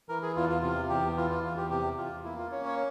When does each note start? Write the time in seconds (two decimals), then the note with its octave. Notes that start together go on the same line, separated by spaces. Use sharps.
0.09 E3 A#4
0.23 G#4
0.36 E2 F4
0.49 F4
0.62 C3 F4
0.89 E2 G4
1.16 E3 F4
1.31 F4
1.44 E2 F4
1.57 G4
1.70 C3 G4
1.97 E2 F4
2.24 A#3 E4
2.38 F4
2.52 C#4 C#5
2.65 C#5